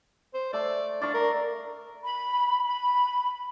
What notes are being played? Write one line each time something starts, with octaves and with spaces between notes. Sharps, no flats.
C5
A3 D5
D4 D5 F5 C#6
A#4
B5
B5